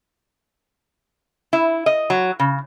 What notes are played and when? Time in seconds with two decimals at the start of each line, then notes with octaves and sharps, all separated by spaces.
1.53 E4
1.86 D#5
2.10 F#3
2.39 C#3